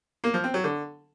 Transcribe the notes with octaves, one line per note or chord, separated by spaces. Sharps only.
A#3
F3
C4
F#3
D3